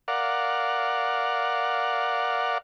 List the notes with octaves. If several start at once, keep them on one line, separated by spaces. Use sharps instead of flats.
A#4 D5 F5 F#5